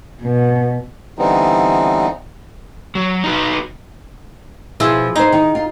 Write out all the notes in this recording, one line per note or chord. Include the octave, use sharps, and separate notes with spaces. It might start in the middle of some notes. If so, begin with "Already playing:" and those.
B2
D3 E3 G3 B3 C4 D#4
F#3
D#4 F#4 B4
B2 F3 E4 F4 G#4
D#4 G#4 C5
D#3
F4